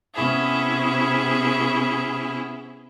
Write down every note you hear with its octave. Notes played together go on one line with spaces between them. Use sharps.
C3 B3 C#4 E4 G#4